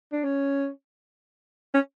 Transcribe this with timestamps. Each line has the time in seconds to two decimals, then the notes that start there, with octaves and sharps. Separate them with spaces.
0.12 D4
0.24 C#4
1.74 C#4